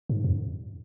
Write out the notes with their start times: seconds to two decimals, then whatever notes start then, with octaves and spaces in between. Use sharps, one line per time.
0.09 G#2
0.24 F2